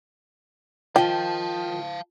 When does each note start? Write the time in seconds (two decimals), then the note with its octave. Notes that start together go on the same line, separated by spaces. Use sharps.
0.96 D#3 F3 F4 F5 G5 A5